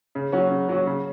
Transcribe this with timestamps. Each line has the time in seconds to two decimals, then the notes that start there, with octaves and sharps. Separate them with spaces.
0.15 C#3
0.32 F#3 C#4 F#4
0.51 C#3
0.69 F#3 C#4 F#4
0.87 C#3